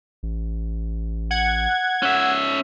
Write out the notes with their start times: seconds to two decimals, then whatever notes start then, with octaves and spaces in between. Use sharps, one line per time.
0.23 A1
1.31 F#5 G#6
2.03 C#4 E5